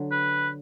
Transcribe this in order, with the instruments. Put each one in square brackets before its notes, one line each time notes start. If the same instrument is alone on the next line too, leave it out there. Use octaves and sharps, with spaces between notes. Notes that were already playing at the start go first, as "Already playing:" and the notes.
Already playing: [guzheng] D3 F#3
[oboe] B4